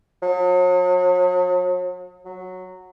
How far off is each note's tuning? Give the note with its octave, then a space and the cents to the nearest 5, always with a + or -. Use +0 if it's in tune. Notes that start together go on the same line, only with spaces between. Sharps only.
F#3 -40
F#3 -5